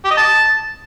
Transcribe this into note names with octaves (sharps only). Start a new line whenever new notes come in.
G4
D#5
A5